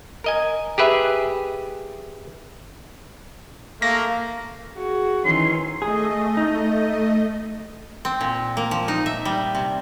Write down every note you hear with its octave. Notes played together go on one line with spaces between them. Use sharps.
A#4 D#5 G#5
G4 G#4 B4 E5
A3 A#3 F5 A#6
F#4 G#4
D#3 E3 C#4 C6
A3 G#4 D#5
D#4
C4
A#2
A#3
F3
D#4
E5
G3
C3